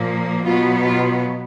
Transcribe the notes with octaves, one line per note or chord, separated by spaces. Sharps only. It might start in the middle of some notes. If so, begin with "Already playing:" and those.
Already playing: A#2 F3 A#3
B2 F#3 B3 F4
F4